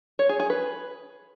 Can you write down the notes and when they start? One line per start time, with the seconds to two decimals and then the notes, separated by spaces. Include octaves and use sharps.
0.19 C#5
0.29 G#4
0.40 G#4
0.50 B4